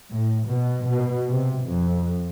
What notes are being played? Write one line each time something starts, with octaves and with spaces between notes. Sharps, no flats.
A2
B2
B2
C3
F2